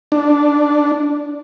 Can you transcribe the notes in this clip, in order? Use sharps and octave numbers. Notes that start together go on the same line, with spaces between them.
D4